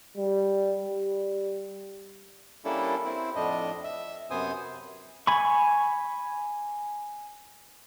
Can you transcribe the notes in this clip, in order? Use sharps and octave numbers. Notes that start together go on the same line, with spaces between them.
G3
G3
G3 A#3 C#4 D4 E4 A4
C4 E4
F2 A2 D4 D#5
E5
F#2 C3 B3 C5 G#5 D#6
G#5 B5 C#6